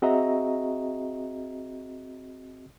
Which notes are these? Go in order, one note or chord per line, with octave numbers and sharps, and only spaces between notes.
C4 F#4 G#4 D#5 E5 A#5